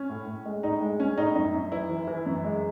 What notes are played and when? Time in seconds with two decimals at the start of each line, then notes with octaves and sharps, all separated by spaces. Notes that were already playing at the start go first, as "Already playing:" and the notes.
Already playing: C#4
0.09 A2
0.27 A2
0.46 G#3
0.63 A2 D#4
0.81 G#3
1.00 G#3 C#4
1.18 A2 D#4
1.35 F#2 D#4
1.54 F#2
1.72 E3 E4
1.90 E3
2.07 E3
2.26 F#2
2.44 G#3